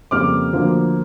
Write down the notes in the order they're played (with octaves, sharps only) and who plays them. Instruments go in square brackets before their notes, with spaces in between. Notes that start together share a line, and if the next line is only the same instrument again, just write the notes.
[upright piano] F2 C#3 G3 A#3 D6 F6
D2 D3 F3 A#3